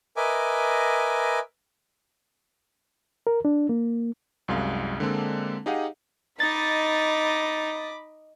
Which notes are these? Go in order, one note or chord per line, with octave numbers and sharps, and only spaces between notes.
A#4 B4 D#5 E5 G#5 D6
A#4
D4
A#3
C2 F#2 G#3 F5
D3 G#3 A#3 C4 D4 A4
D#4 G4 G#4 D#5 F5 F#5
D#4 D#5 B5 D6 A6